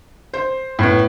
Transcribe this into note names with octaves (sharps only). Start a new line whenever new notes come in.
C5
A2 B3